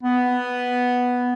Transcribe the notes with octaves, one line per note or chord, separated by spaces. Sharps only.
B3